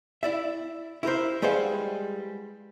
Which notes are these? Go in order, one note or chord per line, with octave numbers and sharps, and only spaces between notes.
E4 D5 E5
E4 G4 A#4 C5
G3 G#3 B4 C5 F5 F#5